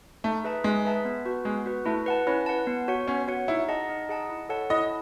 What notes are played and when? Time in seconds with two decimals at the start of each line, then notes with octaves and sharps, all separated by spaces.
0.24 A3 D#4
0.44 G#4 B4 E5 A5
0.64 G#3 D#4
0.85 G#4 B4 E5 A5
1.05 B3
1.25 F#4 B4
1.45 G#3 B3
1.66 F#4 B4
1.86 A3 E4
2.06 B4 F#5 A5
2.27 C#4 E4
2.46 B4 F#5 A5
2.67 B3
2.88 F#4 C#5 F#5
3.08 B3 C#4
3.27 F#4 C#5 F#5
3.48 D#4 E4
3.68 G#4 D#5 F#5 A5
3.89 D#4
4.09 G#4 D#5 F#5 A5
4.29 E4
4.49 A4 C#5 F#5 A5
4.70 E4 D#5